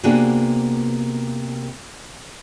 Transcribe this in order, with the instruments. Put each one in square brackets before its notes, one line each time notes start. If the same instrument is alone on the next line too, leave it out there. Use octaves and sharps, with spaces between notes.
[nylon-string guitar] C3 A#3 B3 D4 F#4 G#4